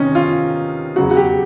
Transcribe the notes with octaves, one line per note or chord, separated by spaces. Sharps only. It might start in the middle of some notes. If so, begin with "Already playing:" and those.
Already playing: C3 D#3 B3 C#4 D#4
F4
E2 C#3 F#3 F#4
F#4
G4